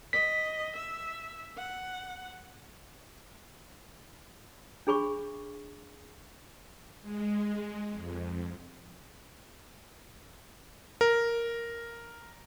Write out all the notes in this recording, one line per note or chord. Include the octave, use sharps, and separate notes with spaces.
D#5 B6
E5
F#5
D4 G#4 B5 C#6
G#3
F2
A#4